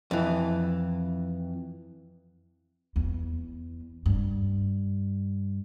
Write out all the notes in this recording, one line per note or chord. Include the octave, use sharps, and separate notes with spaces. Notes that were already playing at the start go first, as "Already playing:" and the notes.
F2 E3
E2
G2